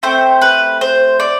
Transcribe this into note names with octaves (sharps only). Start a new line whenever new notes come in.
A3 C4 G4 C5
B4
C5
D5